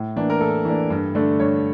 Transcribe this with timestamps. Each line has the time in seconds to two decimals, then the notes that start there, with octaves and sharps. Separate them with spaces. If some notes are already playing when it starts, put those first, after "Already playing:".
Already playing: A2
0.16 E3 A#3 D4
0.30 A#4
0.41 A2 A4
0.65 E3 A#3 D4
0.90 G2
1.15 D3 A3 D4
1.40 G2 C#5